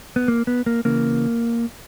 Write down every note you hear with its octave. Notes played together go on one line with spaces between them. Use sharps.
B3
A#3
B3
A#3
C#3 E3 A#3